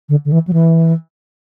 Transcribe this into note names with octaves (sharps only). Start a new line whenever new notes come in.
D3
D3
E3
F#3
E3